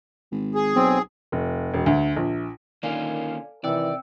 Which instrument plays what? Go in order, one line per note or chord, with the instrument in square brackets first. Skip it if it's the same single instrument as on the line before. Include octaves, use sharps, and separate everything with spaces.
[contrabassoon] G#1
[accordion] G#4
[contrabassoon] B1 [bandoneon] C4
[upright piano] F1
E1
D2
A#1
[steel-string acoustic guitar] D3 [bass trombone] D#3 [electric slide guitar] A#3 C#4 F4 [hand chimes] D5 F5 G#5
[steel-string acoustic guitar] C3 D#3 [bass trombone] E3 [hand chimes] C4 G5 E6 [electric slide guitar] D5